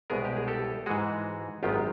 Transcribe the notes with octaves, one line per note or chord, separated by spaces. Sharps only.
C2 B2 G#3 B3 G#4 A#4
G4
G#4
G4 A4
G#2 E3 G#3 F#4 G#4
G#1 F#2 D#3 G#3 B3 F4 G4